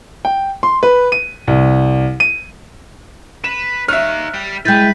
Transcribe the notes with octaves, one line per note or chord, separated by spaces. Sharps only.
G5
C6
B4
D#7
C2
D#7
B4 E7
D#4 C#5 E5 F5 F6 F#6
G3 G5
G#3 E4 B4 G5 G6 A6